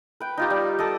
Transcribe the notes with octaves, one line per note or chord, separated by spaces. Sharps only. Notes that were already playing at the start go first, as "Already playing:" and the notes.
B4 G5
D#4 F4 G4
G3
A4 D5 D#5